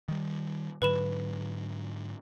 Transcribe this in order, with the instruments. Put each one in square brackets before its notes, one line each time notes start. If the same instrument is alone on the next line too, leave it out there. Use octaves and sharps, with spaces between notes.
[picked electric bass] D#3 G3
[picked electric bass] G#2 D3 F#3 [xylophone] B4 B5 E7